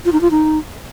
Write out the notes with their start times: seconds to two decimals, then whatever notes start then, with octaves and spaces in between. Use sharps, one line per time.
0.05 F4
0.12 D#4
0.21 F4
0.31 D#4